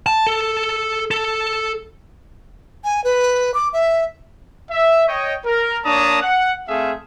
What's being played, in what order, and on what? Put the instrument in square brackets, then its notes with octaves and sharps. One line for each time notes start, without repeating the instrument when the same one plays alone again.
[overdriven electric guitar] A5
A4
A4
[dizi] G#5
B4
D6
E5
[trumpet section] E5
C#5 D#5 G5
A#4
A#3 D4 C#5 A5 A#5 D#6
F#5
A3 C4 G#4 E5 F5